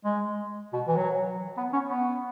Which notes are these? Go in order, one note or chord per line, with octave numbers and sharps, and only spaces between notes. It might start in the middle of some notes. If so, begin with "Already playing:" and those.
G#3
B2
E3
F#3
B3
C#4
B3